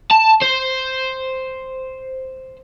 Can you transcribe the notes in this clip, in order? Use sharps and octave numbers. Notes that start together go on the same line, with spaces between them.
A5
C5